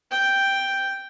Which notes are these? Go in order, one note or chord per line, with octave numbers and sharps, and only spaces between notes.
G5